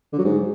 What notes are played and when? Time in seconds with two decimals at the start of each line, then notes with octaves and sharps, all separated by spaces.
0.12 D3
0.18 F#3
0.25 G#2